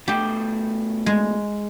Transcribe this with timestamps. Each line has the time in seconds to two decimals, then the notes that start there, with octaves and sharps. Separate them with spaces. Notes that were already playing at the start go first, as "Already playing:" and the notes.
0.08 B2 A3 G4 G5
1.06 G#3